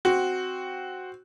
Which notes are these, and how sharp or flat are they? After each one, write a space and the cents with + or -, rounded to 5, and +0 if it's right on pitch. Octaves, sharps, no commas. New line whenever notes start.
C4 +0 F#4 +0